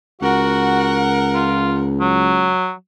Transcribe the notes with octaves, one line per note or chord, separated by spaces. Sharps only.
C#2 F#4 A#4 F#5
F4
F#3